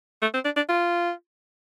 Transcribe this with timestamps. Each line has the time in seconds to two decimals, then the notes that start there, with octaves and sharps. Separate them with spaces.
0.22 A3
0.34 C4
0.45 D4
0.56 D4
0.69 F4